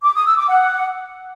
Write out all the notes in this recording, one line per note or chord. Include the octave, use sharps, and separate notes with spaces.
D6
D#6
E6
D6
F#5